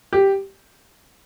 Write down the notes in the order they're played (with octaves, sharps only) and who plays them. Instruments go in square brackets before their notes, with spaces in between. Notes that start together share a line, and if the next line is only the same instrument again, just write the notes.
[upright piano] G4